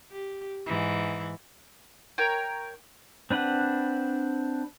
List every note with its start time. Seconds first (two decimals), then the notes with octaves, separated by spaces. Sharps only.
0.11 G4
0.66 G#2 E3
2.18 A#4 C#5 G5
3.30 C4 D4 B4 F#5